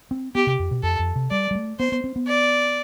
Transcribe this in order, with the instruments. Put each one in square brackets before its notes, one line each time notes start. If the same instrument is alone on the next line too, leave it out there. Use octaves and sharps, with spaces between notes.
[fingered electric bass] C4
[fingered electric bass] B3 [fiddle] G4
[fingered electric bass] C3
F2
B2
[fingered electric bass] F2 [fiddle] A4
[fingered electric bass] F2
C3
[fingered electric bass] G3 [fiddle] D5
[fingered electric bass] G3
A3
[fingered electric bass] B3 [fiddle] C5
[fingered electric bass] B3
C4
B3
[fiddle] D5